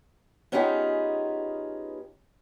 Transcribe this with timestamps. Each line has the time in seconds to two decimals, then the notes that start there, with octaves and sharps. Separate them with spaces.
0.52 B3 C#4 D#4 F4 G4 G#4